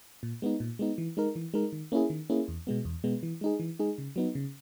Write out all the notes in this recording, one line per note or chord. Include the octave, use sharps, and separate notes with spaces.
A#2
G#3 B3 D#4
A#2
G#3 B3 D#4
E3
G#3 D#4 A#4
E3
G#3 D#4 A#4
D#3
A#3 C#4 E4 G#4
D#3
A#3 C#4 E4 G#4
E2
B2 G#3 B3
E2
B2 G#3 B3
E3
G#3 D#4 G#4
E3
G#3 D#4 G#4
C#3
F#3 B3 D#4
C#3